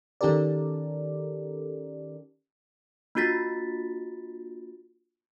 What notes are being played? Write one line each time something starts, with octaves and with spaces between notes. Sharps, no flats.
D#3 C#4 G4 A4 A#4 D5
A#3 D4 F4 F#4 A6 B6